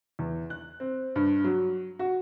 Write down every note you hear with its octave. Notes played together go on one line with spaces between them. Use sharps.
E2
F#6
C4
G2
F#3
F#4